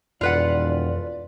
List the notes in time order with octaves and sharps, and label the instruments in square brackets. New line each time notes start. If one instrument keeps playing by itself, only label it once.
[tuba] E1 [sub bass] F2 [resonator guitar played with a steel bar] F4 B4 F#5 [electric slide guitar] D5